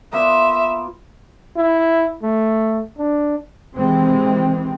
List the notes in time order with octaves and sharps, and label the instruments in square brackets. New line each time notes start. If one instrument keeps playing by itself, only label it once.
[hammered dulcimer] A#3 B3 F4 [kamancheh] E5
[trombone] E4
A3
D4
[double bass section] C3 D#3 E3 G#3 C4